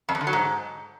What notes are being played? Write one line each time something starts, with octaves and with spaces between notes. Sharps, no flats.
F2
E2
D3
F#3
G#2